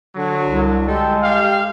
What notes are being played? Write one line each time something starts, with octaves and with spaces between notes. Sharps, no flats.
D3 F#3
C2
G#3 G4 A4
G4 F5